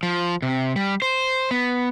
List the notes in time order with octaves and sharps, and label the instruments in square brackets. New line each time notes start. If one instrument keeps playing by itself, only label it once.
[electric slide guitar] F3
C3
G3
C5
B3